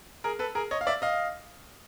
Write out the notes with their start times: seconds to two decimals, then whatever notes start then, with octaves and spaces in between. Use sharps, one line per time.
0.24 G#4 A#4
0.39 A4 B4
0.55 G#4 A#4
0.71 C#5 D#5
0.81 F5
0.87 D5 E5
1.02 D#5 F5